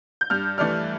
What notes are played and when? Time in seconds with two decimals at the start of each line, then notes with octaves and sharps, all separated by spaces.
0.21 G6
0.30 G2 F6
0.58 E3 A3 D4 F6